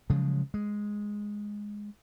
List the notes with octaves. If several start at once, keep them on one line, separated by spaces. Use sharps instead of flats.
C#3 F3 F#3 G#3
G#3